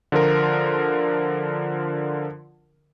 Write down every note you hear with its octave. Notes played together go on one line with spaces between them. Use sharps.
D3 F3 F4 A#4